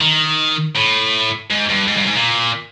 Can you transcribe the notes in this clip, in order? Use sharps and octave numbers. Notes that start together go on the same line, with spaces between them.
D#3
A2
G#2
G2
G#2
G2
G#2
A#2